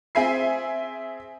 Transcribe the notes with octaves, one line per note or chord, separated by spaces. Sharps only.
C4 G#4 E5 G#5 C7